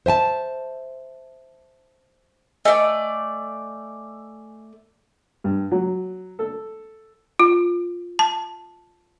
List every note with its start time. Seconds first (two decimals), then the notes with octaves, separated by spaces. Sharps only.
0.06 C5 E5 G#5 A5
2.65 A3 D5 D#5 G#5
5.44 G2
5.72 F#3
6.39 A4
7.39 F4
8.19 A5